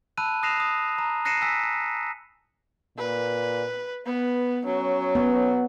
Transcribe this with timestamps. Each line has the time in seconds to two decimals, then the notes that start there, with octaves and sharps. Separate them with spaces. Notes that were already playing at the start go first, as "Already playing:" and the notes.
0.18 A5 B5 E6 F#6 D#7
0.43 D#6 F#6 A#6 C7 E7 F7
0.60 D#6
0.98 A#5
1.25 F#6 A#6 C7 C#7 D#7 E7
1.42 G#5 E6 B6
2.98 A#2 B4
4.06 B3 B4
4.66 F#3 C#4
5.15 B3